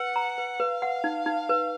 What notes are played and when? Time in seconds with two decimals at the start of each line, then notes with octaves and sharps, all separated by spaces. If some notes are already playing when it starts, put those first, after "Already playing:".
Already playing: B4 F#5
0.16 A#5
0.38 B4
0.60 B4 F5
0.82 F#5
1.04 D#4
1.26 D#4
1.49 B4